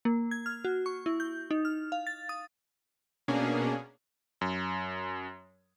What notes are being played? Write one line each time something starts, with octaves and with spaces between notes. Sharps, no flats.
A#3
G#6
F6
F#4
C#6
E4
G6
D#4
F6
F5
A6
D#6
B2 A#3 C#4 D4 G#4
F#2